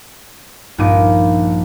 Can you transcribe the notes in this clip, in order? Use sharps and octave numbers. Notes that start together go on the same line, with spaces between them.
A#1 G2 F3 D#4 D6 D#7